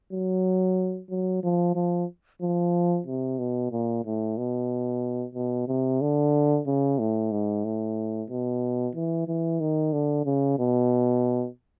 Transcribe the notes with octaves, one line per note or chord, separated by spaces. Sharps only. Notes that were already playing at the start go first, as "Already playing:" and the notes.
F#3
F#3
F3
F3
F3
C3
B2
A#2
A2
B2
B2
C3
D3
C#3
A2
G#2
A2
B2
E3
E3
D#3
D3
C#3
B2